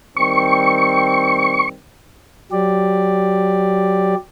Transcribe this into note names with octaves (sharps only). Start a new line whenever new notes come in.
D#3 G3 C4 C#6
F#3 G4 D5